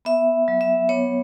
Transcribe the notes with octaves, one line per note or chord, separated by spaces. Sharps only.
B3 E5
F#3
E5
B3 C#5